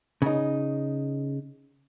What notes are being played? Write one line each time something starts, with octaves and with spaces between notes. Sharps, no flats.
C#3 D#4